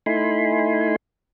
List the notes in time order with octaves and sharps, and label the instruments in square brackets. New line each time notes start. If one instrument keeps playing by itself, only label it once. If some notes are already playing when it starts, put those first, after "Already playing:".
[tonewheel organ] A3 D#4 E4 G#5 B5 C6